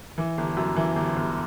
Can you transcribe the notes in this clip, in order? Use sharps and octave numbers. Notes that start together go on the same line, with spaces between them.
E3
G1
F#2
E3
G1
G1